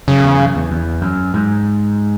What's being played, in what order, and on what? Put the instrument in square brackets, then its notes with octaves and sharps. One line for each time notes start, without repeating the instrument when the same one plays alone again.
[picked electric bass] F#2 [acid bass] C#3
[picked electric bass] E2
F#2
E2
E2
F#2
G#2